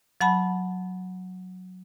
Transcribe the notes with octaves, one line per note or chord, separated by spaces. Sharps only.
F#3 F#5 A5 B5